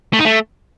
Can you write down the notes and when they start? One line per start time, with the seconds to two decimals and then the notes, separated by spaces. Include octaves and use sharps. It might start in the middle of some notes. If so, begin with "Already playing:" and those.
0.13 A3
0.19 D#4
0.25 A3